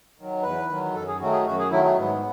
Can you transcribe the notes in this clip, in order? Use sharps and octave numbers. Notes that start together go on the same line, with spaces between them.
D#3 F#3
E2 B4
D#3 F#3
F#2 A4
G#4
D#3 F#3 A3 F#4
G#4
F#2 F#4
G#4
D#3 F#3 A3 E4
A3
G#2 B3